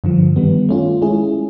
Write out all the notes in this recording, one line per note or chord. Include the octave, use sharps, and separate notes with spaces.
G2 D3 F3
D#3 G3 B3
A3 C#4 F4
G#3 C#4 E4 G#4